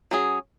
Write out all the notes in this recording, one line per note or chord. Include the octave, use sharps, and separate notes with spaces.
F#3 C#4 G#4